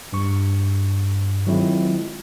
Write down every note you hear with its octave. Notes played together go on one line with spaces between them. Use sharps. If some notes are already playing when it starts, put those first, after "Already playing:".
G2 C#6
D#3 F#3 G#3 C4 E4 F4